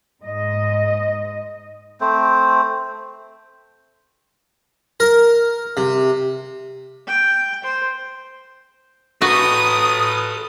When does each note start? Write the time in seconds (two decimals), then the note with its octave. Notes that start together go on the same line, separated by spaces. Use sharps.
0.23 G#2 D#5
2.01 A3 C4 C5
5.00 A#4
5.77 C3
7.07 G5
7.64 C5
9.22 F#4 A4 B4 D#6